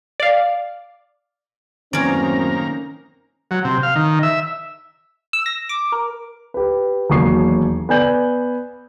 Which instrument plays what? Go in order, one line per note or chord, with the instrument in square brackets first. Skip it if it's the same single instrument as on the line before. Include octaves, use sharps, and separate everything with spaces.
[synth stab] D5 F5
[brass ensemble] F#2 A2 C4 [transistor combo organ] D#3 A#3 A#5 [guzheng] C#4 D5
[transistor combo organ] F#3
C3
F5
D#3
E5
[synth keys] E6
A#6
D6
A#4
[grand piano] G4 B4
E1 D#2 F#3 C#6 C7
B3 D5 G#5 G6 F#7